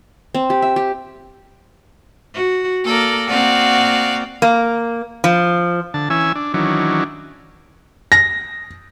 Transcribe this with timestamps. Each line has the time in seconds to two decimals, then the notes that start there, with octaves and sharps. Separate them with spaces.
0.35 C4
0.50 G4
0.62 E5
0.76 G4
2.34 F#4
2.85 A#3 A4 A#4 D5
3.28 A#3 C4 F#4 D5 F5
4.42 A#3
5.24 F3
5.94 D3 A5
6.10 E3 C#4 G#5 E6
6.35 D4
6.54 D#3 E3 F#3 C#4 D4
8.12 A#6